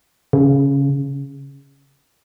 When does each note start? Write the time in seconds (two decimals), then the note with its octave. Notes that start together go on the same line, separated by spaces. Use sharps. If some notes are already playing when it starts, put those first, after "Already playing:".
0.33 C#3